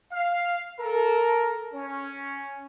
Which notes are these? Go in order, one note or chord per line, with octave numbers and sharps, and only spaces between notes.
F5
A4 A#4
C#4